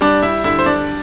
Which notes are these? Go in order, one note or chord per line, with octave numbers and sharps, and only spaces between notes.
G3 D4 D5
E4 E5
D3 E4 E5
C5
D4 D5